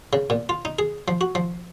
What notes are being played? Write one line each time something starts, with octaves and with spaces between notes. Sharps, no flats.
C#3
A#2
F4
D#4
G#4
F3
F#4
F3